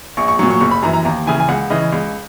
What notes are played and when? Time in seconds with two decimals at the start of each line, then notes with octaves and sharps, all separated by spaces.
0.17 A#1 C#6
0.28 C#6
0.39 A#2 F#3 C#6
0.50 C#6
0.60 F#1 C#6
0.71 B5
0.82 F#2 E3 A#5
0.93 A#5
1.05 D#2 A#5
1.27 C#3 E3 G#5
1.40 G#5
1.49 C#2 F#5
1.70 C#3 E3 D#5
1.93 C#2